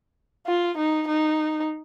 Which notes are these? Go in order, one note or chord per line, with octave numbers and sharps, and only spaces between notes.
F4
D#4
D#4